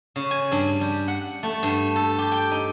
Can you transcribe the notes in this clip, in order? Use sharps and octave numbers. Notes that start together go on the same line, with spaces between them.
C#3
G#5
G2
G3
F#5
A3
G2
A4
G4
G5
D#4